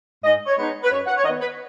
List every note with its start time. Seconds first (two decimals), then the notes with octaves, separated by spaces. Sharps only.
0.24 G#2 D#5
0.46 C#5
0.58 G#3 B3 D#4
0.83 B4
0.90 F#2 C#5
1.06 F#5
1.17 C#5
1.23 D#3 D#5
1.28 B3
1.40 B4